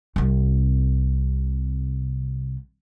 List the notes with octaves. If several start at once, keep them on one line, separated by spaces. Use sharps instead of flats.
C2 C3